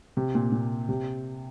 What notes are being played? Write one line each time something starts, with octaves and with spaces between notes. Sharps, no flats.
C3
A#2
A#2
C3